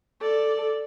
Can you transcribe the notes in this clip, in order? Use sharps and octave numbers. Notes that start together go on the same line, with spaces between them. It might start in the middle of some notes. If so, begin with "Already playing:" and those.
A4 D5